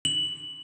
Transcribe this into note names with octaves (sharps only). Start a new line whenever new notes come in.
F#7